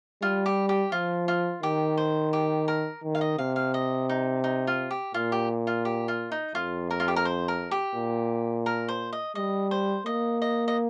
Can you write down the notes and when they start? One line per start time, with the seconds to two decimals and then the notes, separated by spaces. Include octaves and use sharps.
0.22 G3 F4
0.46 G4
0.69 G4
0.92 F3 F4
1.28 F4
1.63 D#3 G4
1.97 C5
2.33 G4
2.68 A#4
3.03 D#3
3.15 F5
3.21 D#5
3.38 C3 F5
3.56 F5
3.74 D#5
4.09 D#4
4.44 D#4
4.67 F4
4.91 G4
5.14 A#2 F4
5.32 G4
5.67 F4
5.85 G4
6.08 F4
6.32 D#4
6.55 F2 F4
6.91 A#4
7.00 F4
7.08 G4
7.16 A#4
7.25 C5
7.48 A#4
7.71 G4
7.95 A#2
8.66 A#4
8.88 C5
9.13 D#5
9.35 G3 D#5
9.71 C5
10.06 A#3 D#5
10.42 D#5
10.68 D#5